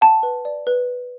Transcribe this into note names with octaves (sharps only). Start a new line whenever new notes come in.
F#5 A5
B4
D5
B4